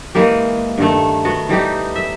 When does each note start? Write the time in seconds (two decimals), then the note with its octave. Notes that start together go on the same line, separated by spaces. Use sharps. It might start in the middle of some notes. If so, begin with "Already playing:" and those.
0.15 E3 G#3 A#3 G4
0.78 G2 D#3 A3
1.25 B3 F#4
1.49 E3 G3 D#4 G4
1.95 E5